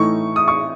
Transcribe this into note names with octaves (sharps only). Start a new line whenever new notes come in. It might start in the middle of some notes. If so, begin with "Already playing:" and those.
Already playing: A2 E3 A3 D#4 C#6
D#6
C#6